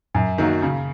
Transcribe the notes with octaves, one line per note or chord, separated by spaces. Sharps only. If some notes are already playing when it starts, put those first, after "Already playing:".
F#2
D#3 F#3 A#3
C#3